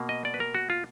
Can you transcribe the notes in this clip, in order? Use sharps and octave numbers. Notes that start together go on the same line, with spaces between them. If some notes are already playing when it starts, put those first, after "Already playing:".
Already playing: B2 A#3
D#5
D5
B4
A#4
F#4
F4